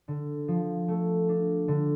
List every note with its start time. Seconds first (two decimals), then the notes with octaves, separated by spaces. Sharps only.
0.08 D3
0.48 F3
0.88 A3
1.29 D4
1.68 D3